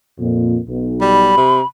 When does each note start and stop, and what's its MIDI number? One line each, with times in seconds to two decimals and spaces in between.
0.19 0.57 41
0.19 0.57 46
0.67 1.33 35
1.01 1.33 55
1.01 1.66 83
1.37 1.61 48